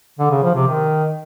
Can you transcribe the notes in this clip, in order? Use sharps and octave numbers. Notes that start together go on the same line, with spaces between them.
D3
C#3
F3
C3
D#3